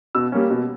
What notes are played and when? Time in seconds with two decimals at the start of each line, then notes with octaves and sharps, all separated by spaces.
0.15 B2 E6
0.32 G3 A#3 C#4
0.50 B2